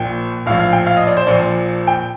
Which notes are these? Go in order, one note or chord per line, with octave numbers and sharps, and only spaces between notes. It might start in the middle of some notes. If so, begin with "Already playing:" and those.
Already playing: A#1 A#2 F3 G5
A#1 A2 F3 F5
F5
G5
F5
D#5
D5
C5
A#1 A#2 F3 D5
G5